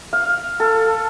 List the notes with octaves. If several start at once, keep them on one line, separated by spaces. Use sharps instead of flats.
F5
A4